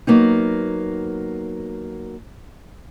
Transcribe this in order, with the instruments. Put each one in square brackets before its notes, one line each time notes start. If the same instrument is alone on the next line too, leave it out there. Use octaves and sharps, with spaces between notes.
[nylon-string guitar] F#3 A#3 B3 D#4